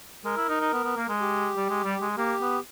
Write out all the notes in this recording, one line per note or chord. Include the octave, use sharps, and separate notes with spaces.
G#3 A#4
E4
D#4
D#4
B3
B3
A#3
G#3
G4
G3
G#3
G3
G#3
A#3 G4
B3